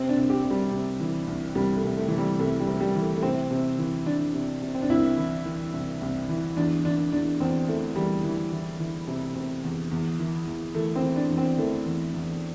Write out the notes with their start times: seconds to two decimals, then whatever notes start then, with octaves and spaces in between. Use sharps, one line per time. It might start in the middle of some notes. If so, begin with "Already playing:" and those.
Already playing: C3 C4
0.09 D4
0.16 C2
0.30 G4
0.45 C3
0.50 G3
0.72 C3
1.00 E3
1.27 C2
1.55 C2 G3
1.77 A3
1.84 C2
1.97 A3
2.08 C3 E3
2.18 G3
2.39 C2 A3
2.60 G3
2.67 C3
2.80 G3
2.95 E3
3.01 A3
3.17 A3
3.22 C3 C4
3.51 C3
3.78 E3
4.06 E3 D4
4.34 C3
4.62 C3
4.75 C4
4.82 D4
4.89 C2 E4
5.18 E3
5.45 E3
5.73 C2
6.01 C2
6.29 E3
6.57 E2 D4
6.85 E3 D4
7.12 E2 D4
7.40 E2 C4
7.68 E3 A3
7.96 E2 G3
8.24 E3
8.52 E3
8.80 E3
9.08 C3
9.35 C3
9.64 E2
9.91 E2
10.19 E3
10.47 E2
10.75 E3 A3
10.96 C4
11.02 E3
11.16 D4
11.30 E2
11.37 C4
11.58 E3 A3
11.86 E2
12.14 E2